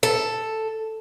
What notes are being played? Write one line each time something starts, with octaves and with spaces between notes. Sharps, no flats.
A4